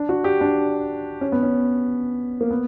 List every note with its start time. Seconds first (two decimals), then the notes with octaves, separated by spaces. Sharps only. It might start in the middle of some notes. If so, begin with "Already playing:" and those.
Already playing: D4
0.09 F#4
0.24 G4
0.41 D4
1.21 C#4
1.32 B3
1.43 C#4
2.41 A#3
2.51 B3